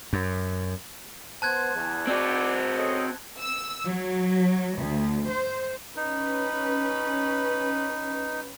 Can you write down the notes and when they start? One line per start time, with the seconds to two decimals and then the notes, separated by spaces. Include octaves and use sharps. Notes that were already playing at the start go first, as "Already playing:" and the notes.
0.13 F#2
1.42 B3 C5 A5 F#6 G#6
1.75 E2
2.08 C4 F#4 D5
2.76 C#4 A4 D#5
3.41 E6
3.87 F#3
4.79 D2
5.28 C5
5.97 C#4 D#4 B4